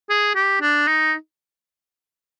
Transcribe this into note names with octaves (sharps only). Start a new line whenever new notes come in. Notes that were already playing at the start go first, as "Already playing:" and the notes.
G#4
G4
D4
D#4